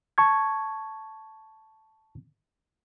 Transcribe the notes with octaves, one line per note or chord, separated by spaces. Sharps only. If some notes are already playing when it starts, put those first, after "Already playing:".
A5 C#6 G#6